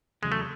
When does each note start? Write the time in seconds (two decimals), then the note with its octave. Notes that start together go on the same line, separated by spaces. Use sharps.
0.22 E2 C#3 F#3 G#3
0.32 A3